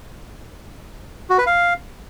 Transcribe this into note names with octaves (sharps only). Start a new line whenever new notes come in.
F#4
B4
F5